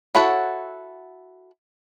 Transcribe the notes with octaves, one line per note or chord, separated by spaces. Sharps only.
E4 F#4 A4 C#5 F#5